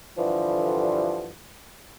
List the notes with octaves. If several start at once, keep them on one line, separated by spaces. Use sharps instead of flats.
G2 D3 E3 F3